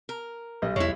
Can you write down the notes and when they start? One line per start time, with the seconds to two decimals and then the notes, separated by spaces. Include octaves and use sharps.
0.09 A#4
0.62 B1 G3 D#5
0.76 E2 G#3 E4 C#5